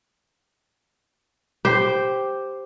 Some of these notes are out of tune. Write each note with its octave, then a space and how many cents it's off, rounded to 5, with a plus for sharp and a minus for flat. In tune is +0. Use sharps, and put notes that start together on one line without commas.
G4 +0 C5 +0